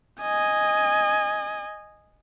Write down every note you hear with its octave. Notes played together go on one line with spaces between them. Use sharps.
D#5 G#5